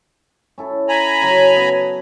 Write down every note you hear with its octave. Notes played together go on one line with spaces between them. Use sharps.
C#4 E4 A4
G#5 A#5 B5
C#3 F#3
B3